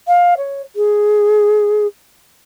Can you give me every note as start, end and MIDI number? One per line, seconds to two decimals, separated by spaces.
0.08 0.34 77
0.38 0.62 73
0.76 1.87 68